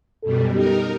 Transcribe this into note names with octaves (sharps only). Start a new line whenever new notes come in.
F#2 B2 G3 A4
D#4 G4 A#4